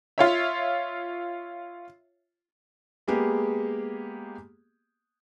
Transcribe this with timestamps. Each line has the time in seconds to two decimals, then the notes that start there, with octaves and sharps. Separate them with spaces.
0.18 F4 C#5 E5
3.08 G#3 A#3 B3 G4 G#4